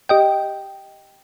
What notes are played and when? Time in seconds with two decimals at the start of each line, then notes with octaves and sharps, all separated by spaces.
0.09 G4 D#5 G5